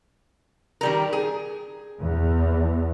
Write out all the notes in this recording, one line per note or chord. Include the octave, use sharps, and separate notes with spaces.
D#3 G3 A#4
G#4
E2